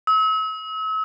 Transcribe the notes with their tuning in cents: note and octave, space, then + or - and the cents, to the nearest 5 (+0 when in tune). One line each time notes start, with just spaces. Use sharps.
E6 -40